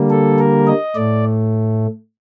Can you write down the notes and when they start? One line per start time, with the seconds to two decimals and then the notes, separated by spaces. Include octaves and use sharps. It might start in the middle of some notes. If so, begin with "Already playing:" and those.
Already playing: D3 G3 A#3
0.10 A4
0.39 A#4
0.67 D#5
0.95 A2 A3 D5